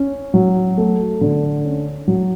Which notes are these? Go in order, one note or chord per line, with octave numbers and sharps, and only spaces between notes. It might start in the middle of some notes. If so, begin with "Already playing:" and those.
Already playing: C#4
F#3
A3
D3
C#4
F#3